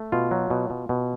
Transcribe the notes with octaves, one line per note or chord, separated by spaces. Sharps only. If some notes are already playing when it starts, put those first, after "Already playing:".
Already playing: A3
B2 F4
F#3
B2
B2
B2